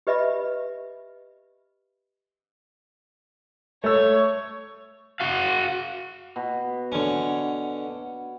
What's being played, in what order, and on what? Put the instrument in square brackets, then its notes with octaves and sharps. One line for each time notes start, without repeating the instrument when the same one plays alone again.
[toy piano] G4 B4 D#5 E5 B5
[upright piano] A3 E6 [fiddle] C#5
[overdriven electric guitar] F#4 F5
[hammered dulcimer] B2
[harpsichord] D3 C#4